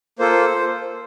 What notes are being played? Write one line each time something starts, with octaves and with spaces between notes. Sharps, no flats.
A#3 F4 A4 C5